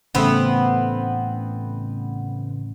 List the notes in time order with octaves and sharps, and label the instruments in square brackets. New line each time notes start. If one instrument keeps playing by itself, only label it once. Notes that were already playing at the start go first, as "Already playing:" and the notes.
[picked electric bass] A1 [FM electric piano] C#3 A3 [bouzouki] B3 C4